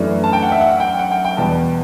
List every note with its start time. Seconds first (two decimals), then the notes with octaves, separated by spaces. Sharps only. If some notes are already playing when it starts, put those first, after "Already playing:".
Already playing: F#2 E3 A3 D4
0.24 A5
0.33 G5
0.42 F#5
0.52 E5
0.61 F#5
0.80 G5
0.99 F#5
1.11 G5
1.25 G5
1.37 E2 B2 G3 A5